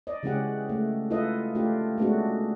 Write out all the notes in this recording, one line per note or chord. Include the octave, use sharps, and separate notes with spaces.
D5 D#5
C#3 E3 G#3 C#4 G4 F#5
A3
E4 F4 A4 B4 D#5
A3 D4 F4 G4
G#3 A3 B3 C#4 D4 F#4